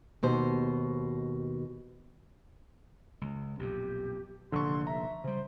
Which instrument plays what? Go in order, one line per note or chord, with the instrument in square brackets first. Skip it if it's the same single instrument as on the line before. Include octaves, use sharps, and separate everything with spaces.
[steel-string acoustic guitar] D#2 B2 C5
[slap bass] C#2
[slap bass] B1 F2 A#2 [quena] G4
[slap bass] F1 A#1 D#2 [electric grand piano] D3 C#6 [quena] C6
[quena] E5 [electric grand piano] A#5
[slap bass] C#3 G3 [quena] C5